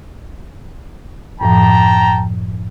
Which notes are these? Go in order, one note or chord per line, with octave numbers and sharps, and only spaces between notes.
F#2 A2 F3 G5 A5 A#5